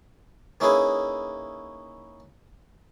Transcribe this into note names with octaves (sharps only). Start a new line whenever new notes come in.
A#3 C#4 D#4 E4 G#4 B4